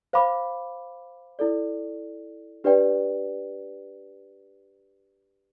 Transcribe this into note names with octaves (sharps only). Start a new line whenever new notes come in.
C5 F5 B5 D6
E4 A4 D5
D4 G4 B4 D5 G5